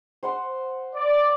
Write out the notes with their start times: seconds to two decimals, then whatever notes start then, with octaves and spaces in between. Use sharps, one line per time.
0.23 C5 F#5 C6
0.95 D5